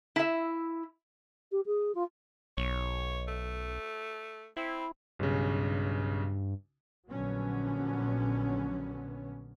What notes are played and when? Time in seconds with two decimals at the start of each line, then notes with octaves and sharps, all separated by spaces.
0.16 E4 E5
1.51 G4
1.66 G#4
1.95 F4
2.57 B1 C#5
3.28 A3
4.57 C4 E4
5.19 B1 G2 C#3
7.10 A#1 D3 F#3 B3 C#4